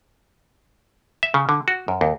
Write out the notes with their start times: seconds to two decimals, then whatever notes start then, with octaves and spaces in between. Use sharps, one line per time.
1.23 E5
1.34 C#3
1.49 D3
1.68 F#4
1.88 F#2
2.01 D#2